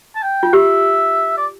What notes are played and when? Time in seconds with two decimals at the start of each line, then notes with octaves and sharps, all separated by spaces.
0.16 A5
0.23 G5
0.43 F4
0.53 G4 E5
1.38 D5